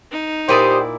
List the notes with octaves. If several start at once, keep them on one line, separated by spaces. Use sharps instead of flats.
D#4
A#2 E4 G4 C5 D5 D#6